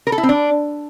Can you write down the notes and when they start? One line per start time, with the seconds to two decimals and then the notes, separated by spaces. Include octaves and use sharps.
0.07 A#4
0.12 A4
0.18 E4
0.23 C4
0.29 D4